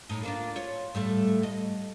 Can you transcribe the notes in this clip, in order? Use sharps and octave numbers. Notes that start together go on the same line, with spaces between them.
A2 D#4
A#3 D4 F4
F4 C#5
A2 G3 A3
D#5